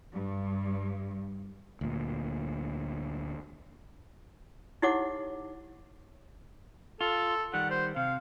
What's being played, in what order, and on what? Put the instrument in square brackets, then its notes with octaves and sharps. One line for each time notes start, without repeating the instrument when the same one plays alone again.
[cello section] G2
[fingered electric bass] D2 A#2
[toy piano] D#4 E4 G4 C#5 F#5 D6
[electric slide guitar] F4 [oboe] A4
[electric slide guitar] D#3 G3 [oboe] F#5
[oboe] C5
[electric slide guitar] C3 [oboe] F5